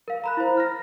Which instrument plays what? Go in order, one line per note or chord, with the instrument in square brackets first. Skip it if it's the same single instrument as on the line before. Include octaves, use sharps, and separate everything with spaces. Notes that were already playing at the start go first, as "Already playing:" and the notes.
[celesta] A#4 F5
A#5 B5 F#6
E4 C5
F6 A#6